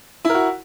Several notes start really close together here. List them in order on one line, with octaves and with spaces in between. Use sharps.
E4 A#4 F#4